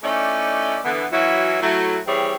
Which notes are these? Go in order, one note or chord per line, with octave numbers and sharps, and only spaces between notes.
A3 C#4 D#4 E4 D5
D3 E3 B3
E3 F#3 C#4 E4 F#4
F#3 A3 E4
E3 G3 C4 E4 G#4 C#5